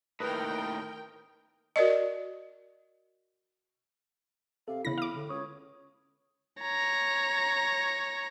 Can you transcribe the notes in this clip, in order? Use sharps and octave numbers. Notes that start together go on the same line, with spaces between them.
D#2 A2 A#4 B4 G5 D#6
F#4 A#4 D5 D#5
C3 A4 F5
E2 C#3 E4 B5 A#6
F5 D6
A2 D3
C#2 C#5 C#6 D#6
C#5 A#5